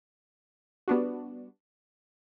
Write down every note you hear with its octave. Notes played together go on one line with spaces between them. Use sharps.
G3 B3 D4 F#4